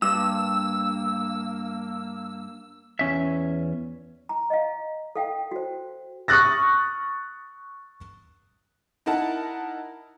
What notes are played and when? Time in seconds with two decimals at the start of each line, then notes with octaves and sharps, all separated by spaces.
0.02 G2 A#3 E6
2.99 E2 C#4 E5
4.29 A#5
4.50 D#5 F5
5.16 A4 F5 G5
5.52 F#4 C5
6.28 C#6 D#6 F6 F#6 A6 A#6
9.06 D#4 E4 A#4 F#5 A5